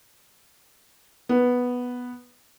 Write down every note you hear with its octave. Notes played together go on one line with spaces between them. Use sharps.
B3